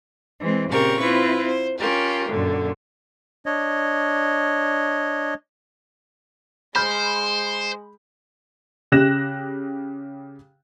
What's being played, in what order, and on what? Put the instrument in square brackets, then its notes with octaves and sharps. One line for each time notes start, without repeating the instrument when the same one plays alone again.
[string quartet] E3 G#3 C4
A#2 C#3 C4 G4 A#4 C#6
C4 E4 F4 B4
C5
C#4 F4 G4 A#4
F#2 A#2 D3
[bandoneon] D4 C#5 D#5
[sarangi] G#3 [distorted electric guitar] C5 [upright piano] B5 F6 G6
[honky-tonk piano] C#3 G4 F#6 A#6 E7